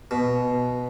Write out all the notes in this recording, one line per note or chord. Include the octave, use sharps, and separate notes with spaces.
B2